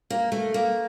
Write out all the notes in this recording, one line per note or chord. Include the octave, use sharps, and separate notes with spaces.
A#3
A3
A#3